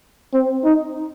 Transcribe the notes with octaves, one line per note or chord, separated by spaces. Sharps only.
C4
D#4